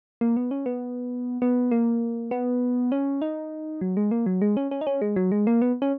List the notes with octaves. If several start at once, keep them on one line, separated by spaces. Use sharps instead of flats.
A#3
B3
C#4
B3
B3
A#3
B3
C#4
D#4
F#3
G#3
A#3
F#3
G#3
C#4
C#4
D#4
C#4
G#3
F#3
G#3
A#3
B3
C#4